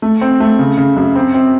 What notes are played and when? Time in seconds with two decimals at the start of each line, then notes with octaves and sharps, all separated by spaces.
0.02 A3
0.21 C4
0.40 A3
0.59 C#3
0.77 C#3
0.97 F#2
1.16 C4
1.34 C4